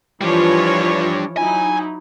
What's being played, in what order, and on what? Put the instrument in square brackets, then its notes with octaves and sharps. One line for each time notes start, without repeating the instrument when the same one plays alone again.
[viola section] E3 F3 C#5 [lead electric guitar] G3 D4
[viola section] F#3 D#4 E4 [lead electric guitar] G#5